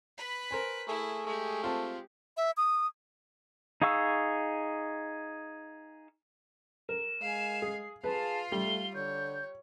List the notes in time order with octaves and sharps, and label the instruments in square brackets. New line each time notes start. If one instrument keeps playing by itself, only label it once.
[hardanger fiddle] B4 B5
[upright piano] A#4 C5 G#5
[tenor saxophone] A3 [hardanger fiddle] E4 [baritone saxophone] G#4
[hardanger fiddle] G#3 G4 [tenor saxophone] A3
[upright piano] C4 A5 [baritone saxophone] F4
[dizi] E5
D#6
[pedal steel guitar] D#4 G#4 F5 C#6 E6
[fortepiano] A#4 [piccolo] E7
[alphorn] G#3 [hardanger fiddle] F5 G#5
[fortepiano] G#4 [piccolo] C7
[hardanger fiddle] F4 F5 [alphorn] G#4 [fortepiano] B4 [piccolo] A5
[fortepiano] G3 [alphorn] A3 [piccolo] G7
[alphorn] D3 [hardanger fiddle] C#5 [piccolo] G6